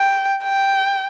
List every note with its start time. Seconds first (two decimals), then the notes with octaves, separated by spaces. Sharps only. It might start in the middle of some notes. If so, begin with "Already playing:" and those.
Already playing: G5
0.43 G5